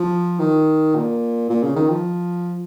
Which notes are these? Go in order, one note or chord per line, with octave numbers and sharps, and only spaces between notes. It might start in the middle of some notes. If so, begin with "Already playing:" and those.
Already playing: F3
D#3
A#2
A#2
C#3
D#3
F3